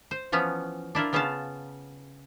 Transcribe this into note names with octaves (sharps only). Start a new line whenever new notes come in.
C5
E3 F3 B3 C#4
D4 E4 F4 A#4
C#3 B3 C#4 F4 F5 A5